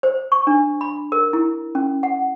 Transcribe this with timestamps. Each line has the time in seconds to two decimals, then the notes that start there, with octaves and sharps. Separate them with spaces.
0.03 C5
0.32 C#6
0.47 D4
0.81 B5
1.12 A#4
1.33 E4
1.75 C#4
2.03 F#5